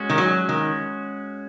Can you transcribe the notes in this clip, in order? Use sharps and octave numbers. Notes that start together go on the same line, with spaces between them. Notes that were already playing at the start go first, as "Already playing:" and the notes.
Already playing: G#3 C#4 F#4
D#3
F#3
D#3